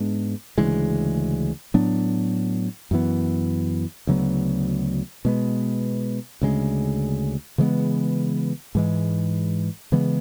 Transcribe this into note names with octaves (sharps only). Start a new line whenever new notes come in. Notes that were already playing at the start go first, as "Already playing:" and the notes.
Already playing: G#2 G#3 B3 D4
D2 C#3 E3 G#3
A2 F#3 B3 D4
F#2 E3 B3
D2 C#3 F#3 B3
B2 G#3 B3
D2 C#3 G#3
C#3 E3 G#3 B3
G#2 E3 G#3
C#3 E3 G#3 B3